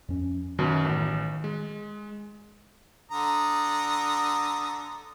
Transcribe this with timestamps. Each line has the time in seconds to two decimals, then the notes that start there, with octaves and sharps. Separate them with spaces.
0.08 F2 C#4
0.59 F#2 B2 D#3
0.85 A1
1.44 G#3
3.11 D3 A#5 D#6